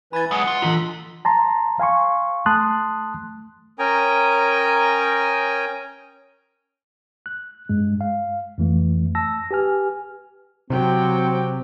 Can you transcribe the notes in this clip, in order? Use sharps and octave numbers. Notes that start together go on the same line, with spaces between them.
E3 B4 G#5 B5 A6
F#3 G#3 F#5 D#6
F4
E3 F4 A#5 C6
A5 A#5 C6
F5 G#5 C6 C#6
A3 A5 C6 D#6 F#6
C#4 A#4 G5 G#5 A#5 D#6
F#6
G2 G#3
F5
F2 E3 A3
A5 E6 A#6
G4 B4 G#5 F6
C3 F#3 C4 G5